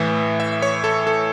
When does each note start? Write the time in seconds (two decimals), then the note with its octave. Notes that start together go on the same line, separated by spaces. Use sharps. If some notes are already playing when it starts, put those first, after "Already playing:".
Already playing: A2 E3 E5
0.40 E5
0.62 C#5
0.84 A4
1.07 A4